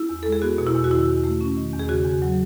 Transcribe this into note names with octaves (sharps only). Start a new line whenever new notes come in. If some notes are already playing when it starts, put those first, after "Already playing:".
Already playing: E4
E2
G#3 A4
G#4
B3 F#4
B2
E4
E2
F#4
D#3 E4
E2
A3
C#4
D#3
E2
G#4
C#3 F#4
E2
F#3